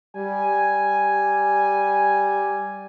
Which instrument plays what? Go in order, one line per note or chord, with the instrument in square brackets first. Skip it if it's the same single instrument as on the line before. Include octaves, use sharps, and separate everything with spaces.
[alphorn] G3 [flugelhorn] G#5